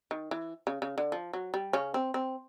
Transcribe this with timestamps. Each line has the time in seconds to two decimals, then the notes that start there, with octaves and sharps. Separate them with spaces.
0.11 D#3
0.31 E3
0.67 C#3
0.82 C#3
0.98 D3
1.12 F3
1.33 F#3
1.54 G3
1.73 C#3 C#4
1.94 C4
2.14 C4